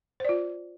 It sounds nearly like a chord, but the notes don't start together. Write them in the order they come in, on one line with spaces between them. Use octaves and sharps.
C5 D5 F4